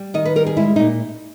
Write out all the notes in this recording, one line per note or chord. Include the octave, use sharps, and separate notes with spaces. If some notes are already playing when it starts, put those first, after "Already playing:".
Already playing: G3
D#3 D#5
B4
G3 A#4
G#4
G#3 E4
A#2 D#4